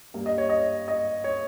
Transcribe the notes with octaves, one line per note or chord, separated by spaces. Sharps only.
G2 G3 A#3
D#5
C#5
D#5
D#5
C#5